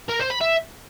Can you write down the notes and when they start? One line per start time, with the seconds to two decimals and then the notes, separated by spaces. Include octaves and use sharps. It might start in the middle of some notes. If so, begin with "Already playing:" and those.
0.09 A#4
0.19 C5
0.30 B5
0.41 E5